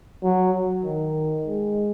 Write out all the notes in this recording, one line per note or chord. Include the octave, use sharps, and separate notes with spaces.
F#3
D#3
G#3